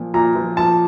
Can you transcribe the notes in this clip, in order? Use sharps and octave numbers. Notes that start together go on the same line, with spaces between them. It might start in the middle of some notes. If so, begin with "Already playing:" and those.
Already playing: A#2 F3
A#2 A#5
F3
F3 A5